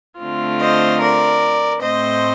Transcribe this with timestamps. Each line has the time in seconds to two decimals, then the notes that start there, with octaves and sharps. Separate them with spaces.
0.19 D3 A3 C4 F4
0.59 C5 D#5
1.00 A#4 D5
1.81 A2 A3 C4 C5 D#5